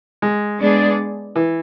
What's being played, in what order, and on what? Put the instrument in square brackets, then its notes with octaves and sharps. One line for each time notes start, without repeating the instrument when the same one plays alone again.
[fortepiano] G#3
[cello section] G#3 B3 D4 G#4 D5
[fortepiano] E3